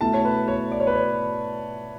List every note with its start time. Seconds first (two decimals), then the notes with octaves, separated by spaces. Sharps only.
0.01 B2 A3 E4 A5
0.14 C#5
0.25 B4
0.48 C#5
0.72 D5
0.80 C#5
0.87 B4
0.95 C#5